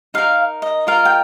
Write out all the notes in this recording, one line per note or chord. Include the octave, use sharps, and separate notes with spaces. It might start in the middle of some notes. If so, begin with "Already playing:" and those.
D#4 G4 A#4 F5
D#5
F4 A#4 D#5 F5
G5